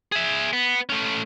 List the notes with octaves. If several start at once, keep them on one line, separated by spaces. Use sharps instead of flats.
G#4 E5
B3
A3 C#4